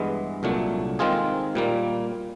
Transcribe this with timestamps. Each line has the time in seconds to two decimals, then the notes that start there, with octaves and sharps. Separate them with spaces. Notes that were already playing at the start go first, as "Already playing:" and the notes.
Already playing: G2 E3 G#3 B3
0.43 C2 A#2 F#3 A3 D4
0.99 D#3 G#3 C4 F4 G#4
1.55 A#2 G3 A#3